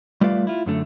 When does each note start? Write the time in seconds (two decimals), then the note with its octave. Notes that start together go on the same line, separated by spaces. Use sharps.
0.21 G3 A3 F4 B4 D5 F5
0.47 E4 F4
0.66 F#2 D3 A3